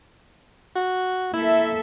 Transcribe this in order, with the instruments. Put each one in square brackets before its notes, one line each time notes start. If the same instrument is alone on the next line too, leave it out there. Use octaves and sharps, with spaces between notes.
[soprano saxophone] F#4
[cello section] A#3 A4 E5 [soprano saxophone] E4